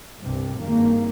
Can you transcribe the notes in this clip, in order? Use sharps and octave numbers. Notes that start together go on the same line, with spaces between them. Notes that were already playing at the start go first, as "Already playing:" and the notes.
C2 G2 C3
G#1 G2 D#3 A#3